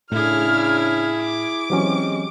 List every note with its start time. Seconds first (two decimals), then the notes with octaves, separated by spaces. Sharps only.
0.12 A2 C#3 D4 E4 G#4 F6
1.22 D6
1.70 E3 F#3 G#3 C4 C#4 G4